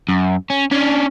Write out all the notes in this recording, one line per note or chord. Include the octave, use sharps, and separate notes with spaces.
F#2
C#4
C#4 D4